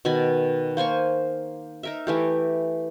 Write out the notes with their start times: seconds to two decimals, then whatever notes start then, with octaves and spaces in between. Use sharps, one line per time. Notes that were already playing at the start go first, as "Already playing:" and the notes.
0.05 B2 D#3 G#5 B5
0.77 A#3 C5 G#5 C#6
1.83 D#4 A#4 E5
2.07 E3 A3 G4